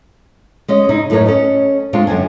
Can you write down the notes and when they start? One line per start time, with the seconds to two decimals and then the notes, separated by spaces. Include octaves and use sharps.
0.68 G#3 C#4 D#5
0.89 C#3 D#4 E4
1.10 F#2 A2 A3 G#4 A#4 C#5
1.26 C#4 A4 D#5
1.93 G#3 C4 D4 F4 C#5
2.07 F#2 D3 C4 G#5